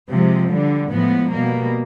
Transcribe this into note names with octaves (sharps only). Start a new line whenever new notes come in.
C3 F3 G#3
D3 G3
A2 F3 G#3 B3
B2 G3 A#3